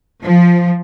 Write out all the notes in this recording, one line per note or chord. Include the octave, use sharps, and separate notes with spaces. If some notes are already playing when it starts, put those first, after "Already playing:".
F3